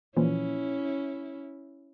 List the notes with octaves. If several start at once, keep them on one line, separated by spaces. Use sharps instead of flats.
A#2 E3 F3 C#4 E4